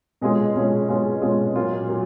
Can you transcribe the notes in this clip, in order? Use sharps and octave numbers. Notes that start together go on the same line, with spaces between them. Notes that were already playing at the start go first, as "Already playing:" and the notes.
B2 G#3 C#4 F4 G#4
B2 G#3 C#4 F4 G#4
B2 G#3 C#4 F4 G#4
B2 G#3 C#4 F4 G#4
A#2 F#3 A#3 C#4 F4
A#2 F#3